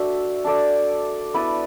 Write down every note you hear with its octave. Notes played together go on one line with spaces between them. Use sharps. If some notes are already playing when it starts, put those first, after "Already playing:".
Already playing: D4 F#4 A4 E5
D4 A4 D5
B3 E4 B4 D5